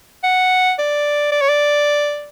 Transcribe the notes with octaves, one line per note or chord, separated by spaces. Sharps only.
F#5
D5
D5
C#5
D5